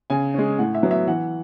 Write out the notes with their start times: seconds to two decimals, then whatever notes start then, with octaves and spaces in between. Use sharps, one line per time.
0.10 C#3 G#5
0.34 G#3 C#4
0.59 A2 F#5
0.75 E5
0.83 F#3 B3
0.91 E5
1.07 E3 F#5